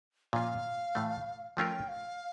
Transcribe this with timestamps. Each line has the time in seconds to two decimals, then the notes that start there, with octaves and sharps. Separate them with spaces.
0.33 A#2 F3 C#4 F4 F5
0.95 A2 E3 A3
1.57 F3 A3 C#4 F4 A#4 G5
1.88 F5